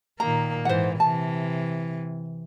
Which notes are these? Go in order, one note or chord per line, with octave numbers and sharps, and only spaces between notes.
A#2 D#3 A#3 A#5
G#2 E3 C5 F#5
C3 E3 A5